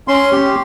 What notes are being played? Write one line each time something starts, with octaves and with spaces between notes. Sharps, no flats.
C#4 C6
G4